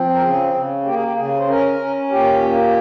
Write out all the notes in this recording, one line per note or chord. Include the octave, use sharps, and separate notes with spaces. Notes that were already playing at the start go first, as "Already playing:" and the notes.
Already playing: F3 C4
A#4
C#3 G#4
C#3
A#3 G4
G#4
G4
C#3 G#4
C5
C#4 A#4
C#4
A#2 G4
A#3